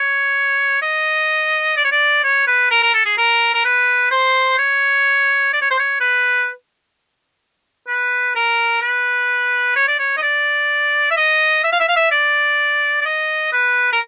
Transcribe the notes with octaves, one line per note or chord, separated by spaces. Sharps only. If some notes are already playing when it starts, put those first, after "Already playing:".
Already playing: C#5
D#5
D5
C#5
D5
C#5
B4
A#4
A#4
A4
G#4
A#4
A#4
B4
C5
C#5
D5
C#5
C5
C#5
B4
B4
A#4
B4
C#5
D5
C#5
D#5
D5
E5
D#5
E5
F5
E5
F5
E5
D5
D5
D#5
B4
A#4